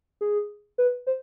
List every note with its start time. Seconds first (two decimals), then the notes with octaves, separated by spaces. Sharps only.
0.21 G#4
0.78 B4
1.07 C5